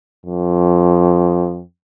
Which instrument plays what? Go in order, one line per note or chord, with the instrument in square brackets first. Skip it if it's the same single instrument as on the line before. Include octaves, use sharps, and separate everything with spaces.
[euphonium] F2